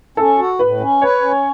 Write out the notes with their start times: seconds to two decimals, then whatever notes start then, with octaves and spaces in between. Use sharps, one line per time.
0.17 C#4 A4
0.38 F#4
0.59 A2 B4
0.80 C#4
1.02 B4 C#5
1.22 C#4